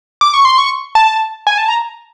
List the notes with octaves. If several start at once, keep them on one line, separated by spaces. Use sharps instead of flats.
D6
C#6
C6
C#6
A5
G#5
A5
A#5